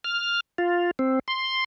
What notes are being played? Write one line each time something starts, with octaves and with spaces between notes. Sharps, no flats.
F6
F4
C4
C6